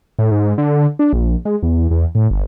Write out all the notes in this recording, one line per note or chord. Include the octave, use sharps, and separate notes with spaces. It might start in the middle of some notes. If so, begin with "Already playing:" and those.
A2
G#2
D3
D4
A#1
G#3
E2
E2
A2
G1